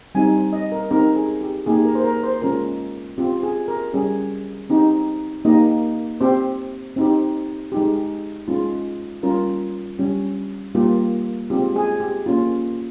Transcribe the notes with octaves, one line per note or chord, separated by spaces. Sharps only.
G3 C4 D#4 G4 G#5
D#5
A#4
C4 D#4 G4 A#4
G#4
G4
A#3 D#4 G4 G#4
A#4
C5
A#4
C5
G#3 C#4 F4 A#4
C4 F4 G4
G#4
A#4
G3 C#4 G4 G#4
C4 D#4 G4
A#3 D#4 G4 D#5
C4 G4 C5
C4 D#4 G4
G#3 D#4 G4
G#3 C#4 F4
G3 C#4 F4 A#4
G3 C#4 G4
G3 A#3 F4 G4
G#3 C4 F4 G4
G#4
G4
A#3 C#4 F4